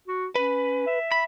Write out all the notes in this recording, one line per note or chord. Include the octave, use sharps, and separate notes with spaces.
F#4
C#4 B4
E5
B5